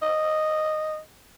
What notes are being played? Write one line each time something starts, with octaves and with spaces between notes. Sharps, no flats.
D#5